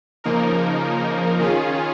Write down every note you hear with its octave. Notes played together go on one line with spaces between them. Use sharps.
C#3 F3 A#3 D#4 A#4
D#3 C#4 F4 G#4